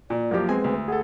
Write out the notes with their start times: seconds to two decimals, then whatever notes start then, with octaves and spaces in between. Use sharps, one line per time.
0.10 A#2 D5
0.31 F#2 F3 A#3 G4
0.49 G#3 B3 C4 B4 G#5
0.64 D2
0.88 G#4 A4 F#5